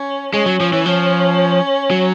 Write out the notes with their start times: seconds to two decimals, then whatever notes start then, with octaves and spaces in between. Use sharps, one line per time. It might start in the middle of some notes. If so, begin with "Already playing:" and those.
Already playing: C#4
0.33 G#3 C#4
0.46 F#3
0.60 F3
0.73 E3
0.86 F3
1.91 F#3